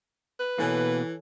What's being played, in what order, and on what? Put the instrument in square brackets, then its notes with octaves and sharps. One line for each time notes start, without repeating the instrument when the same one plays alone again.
[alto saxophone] B4
[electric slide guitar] B2 A#3 [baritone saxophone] E3 [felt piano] A4 C#5 G#5